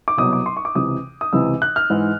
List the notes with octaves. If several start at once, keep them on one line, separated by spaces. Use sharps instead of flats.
D6
C2 B2 F#3 D#6
D6
C6
C#6
D6
C#2 C3 E3 D#6
D#6
C#2 C3 E3 E6
F#6
F6
G#2 E3